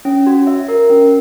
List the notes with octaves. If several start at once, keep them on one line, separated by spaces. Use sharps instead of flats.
C#4
F#4
E5
A#4
C#4